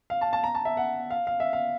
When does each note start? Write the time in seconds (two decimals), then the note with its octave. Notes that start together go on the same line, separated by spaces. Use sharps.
0.10 F5
0.21 A5
0.33 A5
0.44 A#5
0.55 A5
0.65 E5
0.77 F#5
1.10 F5
1.27 F5
1.40 E5
1.53 F5